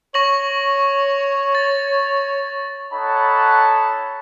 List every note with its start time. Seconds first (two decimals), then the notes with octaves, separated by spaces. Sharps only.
0.14 C#5 C#6 A#6 F#7
1.55 A6
2.93 D#4 A4 C#5 F#5 A5 B5